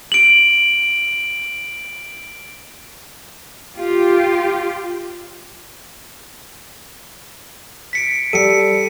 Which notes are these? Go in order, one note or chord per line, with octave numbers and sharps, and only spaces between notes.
D7 F#7
F4 G4
B6 C#7 D7
G3 A4 C#7 D#7